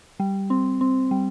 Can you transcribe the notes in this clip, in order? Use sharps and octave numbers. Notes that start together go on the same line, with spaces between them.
G3
C4
C4
G3